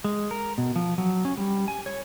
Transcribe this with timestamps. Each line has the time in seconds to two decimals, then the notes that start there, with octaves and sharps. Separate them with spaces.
0.04 G#3
0.31 A#4
0.58 B2
0.76 F3
0.98 F#3
1.25 C#4
1.37 G3
1.68 G#5
1.86 C#5